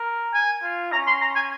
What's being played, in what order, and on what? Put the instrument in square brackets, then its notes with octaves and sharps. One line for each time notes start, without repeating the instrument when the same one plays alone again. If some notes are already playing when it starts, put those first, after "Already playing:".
Already playing: [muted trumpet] A#4
[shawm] G#5
[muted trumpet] F4
[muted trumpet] C#4 [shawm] A#5
[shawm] C6
A#5
G#5